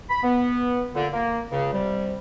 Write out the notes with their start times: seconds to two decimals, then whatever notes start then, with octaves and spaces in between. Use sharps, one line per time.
0.10 B5
0.23 B3
0.95 A#2 D3
1.13 A#3
1.52 C#2 C#3
1.74 C3 G3